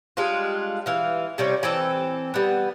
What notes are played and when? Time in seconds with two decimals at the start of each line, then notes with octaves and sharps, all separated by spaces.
0.17 G3 G#3 D4 F4
0.86 E3 F5
1.38 C3 G3 C#4
1.63 E3 C4 A4
2.34 G3 B3